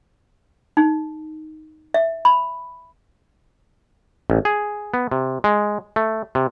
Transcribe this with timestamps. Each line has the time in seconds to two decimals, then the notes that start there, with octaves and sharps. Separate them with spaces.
0.77 D#4
1.94 E5
2.25 B5
4.30 A1
4.45 G#4
4.94 B3
5.11 C3
5.44 G#3
5.96 A3
6.35 C3